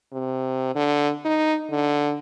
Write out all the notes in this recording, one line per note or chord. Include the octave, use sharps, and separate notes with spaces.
C3
D3
D#4
D3